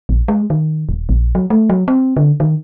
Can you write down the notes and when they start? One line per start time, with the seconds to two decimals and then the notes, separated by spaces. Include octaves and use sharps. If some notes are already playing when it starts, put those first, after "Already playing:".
0.09 A#1
0.28 G#3
0.50 D#3
0.89 D#1
1.09 A#1
1.35 F#3
1.50 A3
1.70 F#3
1.88 C4
2.17 D3
2.40 D#3